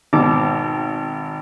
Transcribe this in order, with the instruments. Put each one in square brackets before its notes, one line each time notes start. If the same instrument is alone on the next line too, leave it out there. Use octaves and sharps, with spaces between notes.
[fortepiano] G#1 B2 D6